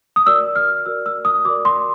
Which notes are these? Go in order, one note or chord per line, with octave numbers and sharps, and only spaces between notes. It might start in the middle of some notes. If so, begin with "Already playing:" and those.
D#6
F#4 A#4 D5 E6
F6
F#4 A#4 D5 E6
E6
D#6
F#4 A#4 D5 D6
C6